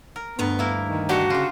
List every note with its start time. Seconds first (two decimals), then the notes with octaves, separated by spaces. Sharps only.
0.16 A#4
0.39 D2 G2 B3 A#5
0.59 A#3 E4 A#4
0.89 D#3
1.09 D3 D4 F#4 G4
1.30 C#3 F4 G4